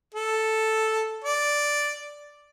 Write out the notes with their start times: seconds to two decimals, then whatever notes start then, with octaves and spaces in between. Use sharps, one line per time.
0.14 A4
1.24 D5